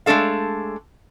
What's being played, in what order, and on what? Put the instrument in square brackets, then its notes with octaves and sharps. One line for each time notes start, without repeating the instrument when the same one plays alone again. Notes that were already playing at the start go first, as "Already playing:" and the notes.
[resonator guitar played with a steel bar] G#3 A3 D4 A4 F5